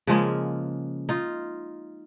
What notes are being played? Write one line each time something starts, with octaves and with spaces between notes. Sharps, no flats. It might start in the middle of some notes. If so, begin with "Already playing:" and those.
C#3 F3 G#3 A#3
D#4 F4